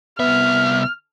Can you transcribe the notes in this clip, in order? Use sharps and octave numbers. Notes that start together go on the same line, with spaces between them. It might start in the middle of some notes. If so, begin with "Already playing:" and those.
C2 B3 E5 F6